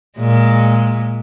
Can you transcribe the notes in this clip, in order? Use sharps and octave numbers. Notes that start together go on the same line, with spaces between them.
A#2 G#3